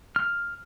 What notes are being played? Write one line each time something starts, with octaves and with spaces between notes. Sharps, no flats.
F6